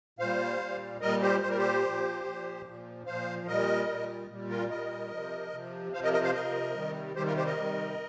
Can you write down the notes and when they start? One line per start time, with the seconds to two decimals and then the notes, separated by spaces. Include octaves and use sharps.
0.19 A#2 G3 C5 F5
0.60 A#2 G3
1.01 A#2 G3 A#4 D#5
1.22 G4 C5
1.42 A#2 G3 C5
1.50 A#4
1.57 G4 C5
1.84 A#2 F3
2.24 A#2 F3
2.66 A#2 F3
3.06 A#2 F3 C5 F5
3.47 A#2 G3 A#4 D#5
3.88 A#2 G3
4.29 A#2 G3
4.49 F4 A#4
4.69 A#2 G3 A#4 D#5
5.11 C3 F3
5.52 C3 F3
5.93 F3 C5 F5
5.97 C3
6.03 A#4 D#5
6.13 A#4 D#5
6.23 C5 F5
6.34 C3 F3 A#4 D#5
6.75 C3 D#3 G3
7.15 C3 D#3 G3 G4 C5
7.26 F4 A#4
7.36 G4 C5
7.46 A#4 D#5
7.57 C3 D#3 G3